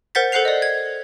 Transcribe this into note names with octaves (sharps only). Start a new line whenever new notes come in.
A#4 C5 F#5 G6 A6 B6
A4 C5 F#5 F#6 C7 F7
D5 D#5
G#6